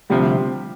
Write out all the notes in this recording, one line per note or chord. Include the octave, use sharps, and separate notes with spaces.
D2 C3 F3 G3 G4